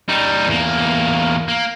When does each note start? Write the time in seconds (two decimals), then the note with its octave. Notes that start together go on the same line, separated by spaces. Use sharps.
0.09 G3 D#4
0.47 E2 A#3
1.48 A#3